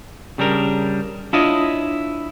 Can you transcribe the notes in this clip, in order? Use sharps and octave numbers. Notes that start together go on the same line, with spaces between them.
C#3 G3 D4 A#4
D4 E4 F4 C#5 D#5